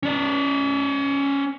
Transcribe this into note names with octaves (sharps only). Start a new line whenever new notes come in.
C#4 D5